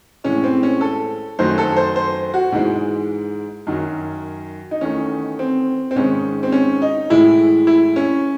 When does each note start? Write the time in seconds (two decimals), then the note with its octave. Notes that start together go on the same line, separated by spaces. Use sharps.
0.24 A2 E3 G#3 C#4
0.44 C4
0.63 C#4
0.81 A4
1.39 F#2 D#3 F#3 A3 C5
1.58 A4
1.76 C5
1.96 C5
2.34 F#4
2.52 G#2 E3 G#3
3.67 F#2 D#3 F#3
4.71 D#4
4.81 E2 D#3 A3 C#4
5.39 C4
5.91 C4
5.96 G#2 D#3 G#3 C#4
6.43 C4
6.52 C#4
6.82 D#4
7.10 A2 E3 G#3 E4
7.67 E4
7.96 C#4